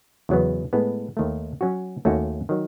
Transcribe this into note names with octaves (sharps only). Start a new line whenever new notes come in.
E2 C#3 F#3 B3
A2 G#3 B3
D#2 D#3 A3
F#3 C#4 F#4
D#2 D#3 A3 C#4 F#4
D#3 F#3